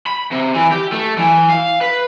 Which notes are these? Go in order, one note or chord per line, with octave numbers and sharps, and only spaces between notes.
B5
C3
E3
G4
A3
E3
F5
B4